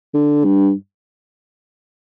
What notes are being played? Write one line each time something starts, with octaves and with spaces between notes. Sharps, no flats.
D3
G2